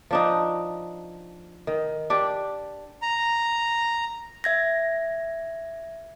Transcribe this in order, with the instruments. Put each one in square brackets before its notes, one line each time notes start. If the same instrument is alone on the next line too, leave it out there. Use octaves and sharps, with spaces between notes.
[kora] F3 D4 D#4
D#3
D4 G4 D5
[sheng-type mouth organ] A#5
[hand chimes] E5 G#6 A#6